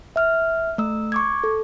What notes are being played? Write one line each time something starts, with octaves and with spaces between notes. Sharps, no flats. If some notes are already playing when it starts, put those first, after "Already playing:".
E5 F6
A3 E6
C#6 D6 G#6
A4